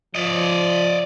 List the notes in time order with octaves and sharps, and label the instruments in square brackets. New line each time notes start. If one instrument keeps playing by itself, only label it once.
[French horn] F3 [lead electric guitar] D5 D#5